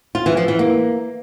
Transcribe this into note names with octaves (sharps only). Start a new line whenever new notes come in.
F4
E3
F3
E3
A#3